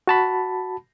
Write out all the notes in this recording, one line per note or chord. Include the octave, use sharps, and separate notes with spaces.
F#4 A5 B5